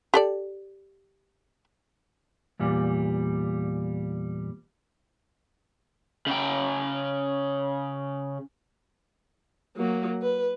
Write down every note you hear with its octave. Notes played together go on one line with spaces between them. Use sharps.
G4 A4 D5
E2 A#2 G3
C#3 G5
F#3 A#3
B4